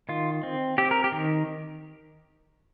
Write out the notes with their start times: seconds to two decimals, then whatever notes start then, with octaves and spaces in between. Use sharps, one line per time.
0.09 D#3 F4
0.43 C4
0.78 C4 G4
0.91 A#4
1.04 G4
1.12 D#3